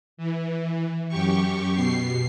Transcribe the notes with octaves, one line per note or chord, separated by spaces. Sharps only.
E3
F#2 G4 C#6
B2 C7